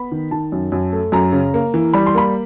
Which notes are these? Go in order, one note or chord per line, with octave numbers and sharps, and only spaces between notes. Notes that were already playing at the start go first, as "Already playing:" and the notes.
Already playing: B3 B5
D#3
D#3 A5
F#2
F#2
A3
F#2 A#5
C#3
A#3
E3
G3 B5
C6
A#3 B5